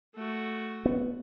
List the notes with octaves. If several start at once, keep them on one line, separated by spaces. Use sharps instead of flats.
A3 F#4
B3